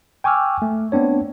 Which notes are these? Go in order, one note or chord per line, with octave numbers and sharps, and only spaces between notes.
G5 G#5 C#6 D6 E6 F6
A3
B3 C4 D4 C#5